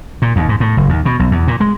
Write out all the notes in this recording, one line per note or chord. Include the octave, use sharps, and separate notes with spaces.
A#2
D#2
G#2
A2
F#1
D#2
B2
B1
E2
A#2
G#3